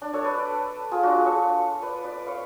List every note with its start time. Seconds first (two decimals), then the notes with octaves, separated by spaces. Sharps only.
0.02 D4
0.13 A4 C#5
0.24 B4 D5
0.92 F4 G#4
1.03 D4 F#4
1.14 F4 G#4
1.26 A4 C#5
1.82 B4 D5
2.04 B4 D5
2.27 C#5 F5